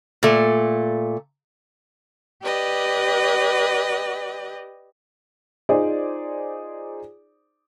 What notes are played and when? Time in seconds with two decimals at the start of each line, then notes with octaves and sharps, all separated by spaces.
0.23 A#2 A3
2.42 G4 B4 D5 D#5
5.69 D#4 F4 G#4 C5 D5